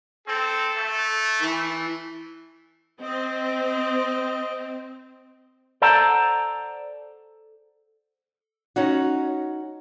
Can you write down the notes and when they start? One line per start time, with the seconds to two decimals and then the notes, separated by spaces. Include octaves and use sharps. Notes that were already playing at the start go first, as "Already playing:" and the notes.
0.28 C4 A4
0.76 A3
1.42 E3
3.02 C4 D#5
5.82 A4 C5 D5 F#5 A5 A#5
8.76 C#4 D#4 F#4